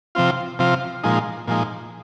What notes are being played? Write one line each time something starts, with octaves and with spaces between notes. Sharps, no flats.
C3 F3 C4 F4
C3 F3 C4 F4
A#2 F3 G#3 D#4
A#2 F3 G#3 D#4